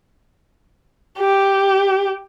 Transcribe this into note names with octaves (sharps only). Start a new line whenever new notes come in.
G4